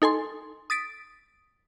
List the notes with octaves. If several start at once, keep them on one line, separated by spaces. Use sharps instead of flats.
D#4 A4 G#5 C6
D#6 A6 B6 D7